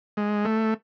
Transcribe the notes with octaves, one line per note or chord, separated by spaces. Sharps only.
G#3
A3